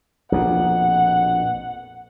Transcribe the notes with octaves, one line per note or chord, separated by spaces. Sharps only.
A#1 F2 B2 F#5